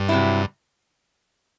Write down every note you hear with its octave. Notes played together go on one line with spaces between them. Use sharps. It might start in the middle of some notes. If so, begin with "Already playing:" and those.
Already playing: G2
C3 F#3 C4 E4